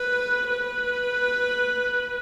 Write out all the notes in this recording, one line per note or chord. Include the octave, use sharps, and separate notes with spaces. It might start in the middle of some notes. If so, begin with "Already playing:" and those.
Already playing: B4
B4